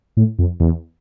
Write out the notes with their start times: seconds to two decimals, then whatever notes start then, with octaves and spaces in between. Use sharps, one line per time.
0.17 A2
0.39 F2
0.60 E2